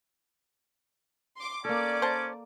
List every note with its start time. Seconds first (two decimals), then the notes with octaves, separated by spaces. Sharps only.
1.36 C6 D6
1.65 A#3 C#4 A4 D5 D6
2.02 C5 A5